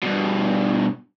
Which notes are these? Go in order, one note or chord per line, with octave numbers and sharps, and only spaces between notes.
G2 B2